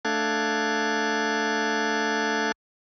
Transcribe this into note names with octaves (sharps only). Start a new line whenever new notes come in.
A3 D4 A4 F5 F#6 G#6